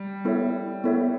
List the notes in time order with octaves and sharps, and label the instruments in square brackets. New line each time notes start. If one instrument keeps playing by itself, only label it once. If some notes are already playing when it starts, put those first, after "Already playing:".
Already playing: [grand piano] G3
[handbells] B3 E4 A4 C#5 E5
B3 E4 A4 C#5 E5